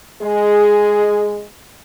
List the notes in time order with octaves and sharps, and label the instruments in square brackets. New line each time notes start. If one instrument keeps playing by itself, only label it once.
[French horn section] G#3 G#4